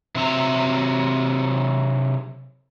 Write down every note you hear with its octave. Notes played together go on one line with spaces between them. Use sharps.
C3 F#3 C4 E5 A#5